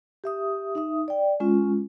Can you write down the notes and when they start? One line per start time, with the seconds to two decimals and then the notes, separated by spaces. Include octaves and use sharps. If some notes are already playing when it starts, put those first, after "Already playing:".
0.24 G4 E5 D#6
0.75 D#4 E5 D#6
1.08 D5 G5
1.40 G#3 C#4 F4